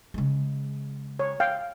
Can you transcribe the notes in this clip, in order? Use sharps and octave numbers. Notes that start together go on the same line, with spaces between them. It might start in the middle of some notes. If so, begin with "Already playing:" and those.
C#3 G#3
C#5
F5 G5